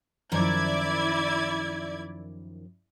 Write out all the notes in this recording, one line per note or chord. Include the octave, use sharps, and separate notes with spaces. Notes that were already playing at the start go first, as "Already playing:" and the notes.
F#2 D#3 F3 E4 D5 G#6